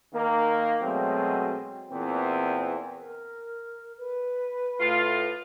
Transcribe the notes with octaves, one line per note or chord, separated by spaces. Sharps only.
D#3 A#3
B2 F#3 G#3 A3 C4
E2 A#2 E3 C4
A#4
B4
A2 F4